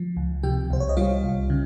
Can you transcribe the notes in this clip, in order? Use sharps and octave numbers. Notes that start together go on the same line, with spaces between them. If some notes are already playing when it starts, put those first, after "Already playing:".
Already playing: F3
C#2
C3 G4 G5
C2 C5
C#5
D#5
G3 F4 F5
C2
C#3